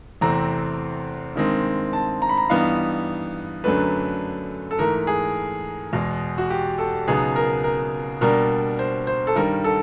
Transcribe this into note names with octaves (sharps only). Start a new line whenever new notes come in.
E2 C3 E3 A3 C4 A#5
G2 D#3 G#3 C4
A5
A#5
B5
A#5
G2 E3 G3 B3 D#4 F5
F#2 D3 F#3 A3 D4 B4
A4
G#2 E3 A3 A#4
G#4
E2 B2 G#3
F#4
G4
A4
C#2 B2 F#3 B3 D#4 G#4
A#4
A#4
B2 G3 A#3 D4 A#4
C5
C5
A4
G2 D#3 G3 A#4
A4